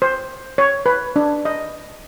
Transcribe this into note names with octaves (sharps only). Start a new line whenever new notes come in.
C5
C#5
B4
D4
D#5